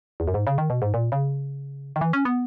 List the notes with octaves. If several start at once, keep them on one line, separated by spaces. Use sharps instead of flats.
E2
F#2
G#2
C#3
D#3
B2
G#2
A#2
C#3
D#3
E3
C#4
B3